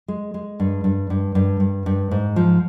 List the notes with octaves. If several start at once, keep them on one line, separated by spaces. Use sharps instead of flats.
G#3
G#3
G2
G2
G2
G2
G2
G2
G#2
F3